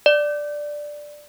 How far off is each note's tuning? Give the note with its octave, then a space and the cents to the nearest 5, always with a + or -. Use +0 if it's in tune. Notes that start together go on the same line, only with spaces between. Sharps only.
D5 +5